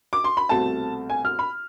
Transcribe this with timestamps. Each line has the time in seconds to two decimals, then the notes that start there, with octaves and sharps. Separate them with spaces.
0.13 D6
0.24 C6
0.37 B5
0.49 C2 B2 A3 C4 A5
1.10 G#5
1.25 F6
1.39 B5